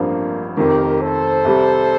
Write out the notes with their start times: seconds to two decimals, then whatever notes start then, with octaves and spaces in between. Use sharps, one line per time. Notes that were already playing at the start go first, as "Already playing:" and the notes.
Already playing: A1 G2 F3 A#3 C4 D4
0.57 F1 F2 D#3 G4 A#4
1.01 A4 C5
1.45 C2 C3 G3